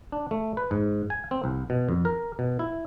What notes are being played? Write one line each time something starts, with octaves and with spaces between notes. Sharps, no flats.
D4
A3
B4
G#2
G#5
C4
C2
B2
F2
A#4
B2
E4